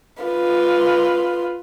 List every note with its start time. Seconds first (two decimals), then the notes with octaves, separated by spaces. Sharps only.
0.23 F4 B4